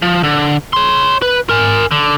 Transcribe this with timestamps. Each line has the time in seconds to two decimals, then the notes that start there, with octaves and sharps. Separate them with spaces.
0.02 F3
0.23 D3
0.73 C#5 C6
1.22 B4
1.49 A#4 G#5
1.91 D3